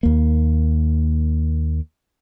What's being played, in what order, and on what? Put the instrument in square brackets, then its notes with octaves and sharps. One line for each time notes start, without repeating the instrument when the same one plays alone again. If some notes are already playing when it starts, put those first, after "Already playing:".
[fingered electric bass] D#2 A#3